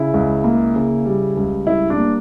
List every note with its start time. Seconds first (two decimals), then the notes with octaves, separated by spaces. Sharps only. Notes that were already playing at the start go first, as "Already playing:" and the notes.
Already playing: C#3 E4
0.14 C#2
0.44 A#3
0.76 C#3
1.06 G3
1.37 C#2
1.67 G3 E4
1.90 D4
1.97 A#3